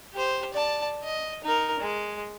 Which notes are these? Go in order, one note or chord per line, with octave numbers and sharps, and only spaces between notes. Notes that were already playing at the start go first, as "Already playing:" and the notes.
G4 C5
D5 A5
D#5
D#4 A#4
G#3